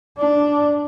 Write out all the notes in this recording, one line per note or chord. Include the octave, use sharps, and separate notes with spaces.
D4